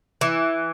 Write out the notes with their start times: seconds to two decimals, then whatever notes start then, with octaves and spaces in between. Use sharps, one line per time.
0.21 E3